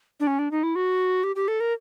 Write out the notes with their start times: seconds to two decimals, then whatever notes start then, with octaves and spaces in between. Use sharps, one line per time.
0.20 D4
0.27 C#4
0.39 D4
0.51 D#4
0.63 E4
0.76 F#4
1.24 G4
1.36 G4
1.48 A4
1.60 A#4